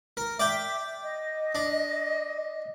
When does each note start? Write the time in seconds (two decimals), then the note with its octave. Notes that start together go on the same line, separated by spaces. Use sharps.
0.17 A#4
0.39 D5 E5 G5 D6
1.03 D#5
1.55 D4